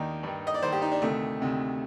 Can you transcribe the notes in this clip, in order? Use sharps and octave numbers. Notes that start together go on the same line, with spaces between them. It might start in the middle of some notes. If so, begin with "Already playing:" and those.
Already playing: D#2 D#3 D4 D#4
G2 D#3
D#5
D5
G2 D#3 C5
G4
D#4
D4
D2 C3 D#3 A3
D2 C3 D#3